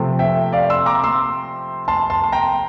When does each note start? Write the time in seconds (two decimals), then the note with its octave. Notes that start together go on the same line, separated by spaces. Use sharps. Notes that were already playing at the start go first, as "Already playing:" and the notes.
Already playing: C3 F3 A3 C4
0.19 E5 G5
0.53 D5 F5
0.70 C6 E6
0.86 A#5 D6
1.04 C6 E6
1.88 A5 C6
2.10 A5 C6
2.24 C6
2.32 G5 A#5